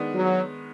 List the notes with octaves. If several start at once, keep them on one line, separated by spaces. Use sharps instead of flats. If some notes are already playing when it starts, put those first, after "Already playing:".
Already playing: D#3 G#3 B3 D4
F#3